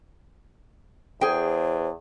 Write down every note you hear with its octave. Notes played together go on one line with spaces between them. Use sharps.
E2 G#4 C5 G5